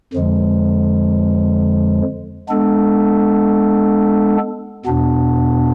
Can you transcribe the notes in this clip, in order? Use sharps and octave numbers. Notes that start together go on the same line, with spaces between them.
F2 D3 F3 G#3
G#3 B3 D4 A4
E2 B2 B3 D4